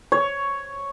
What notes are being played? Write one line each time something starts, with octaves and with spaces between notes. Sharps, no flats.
C#5